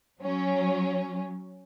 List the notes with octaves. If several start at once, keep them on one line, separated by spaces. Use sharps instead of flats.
F#3 C#4